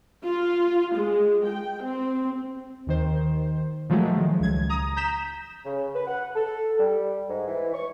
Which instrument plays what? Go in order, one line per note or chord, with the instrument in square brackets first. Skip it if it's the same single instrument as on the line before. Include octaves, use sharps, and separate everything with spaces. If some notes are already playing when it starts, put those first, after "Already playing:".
[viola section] F4
G#3
G5
C4
[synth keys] D#2 D#3 C5
A#2 D#3 F3 F#3 G#3 A3
C#2 G#6
A#5 D#6
A#5 G6 B6 E7
[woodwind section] C#3
B4
F#5
A4
G3
G#2
E3
C#6